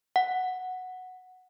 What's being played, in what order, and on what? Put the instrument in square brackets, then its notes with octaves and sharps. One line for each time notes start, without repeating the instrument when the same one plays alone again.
[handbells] F#5